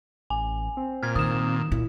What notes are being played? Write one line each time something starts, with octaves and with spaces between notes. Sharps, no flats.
A1 G#5
C4
A#2 F6 G#6
D#3 D#6 E7
A#2 E4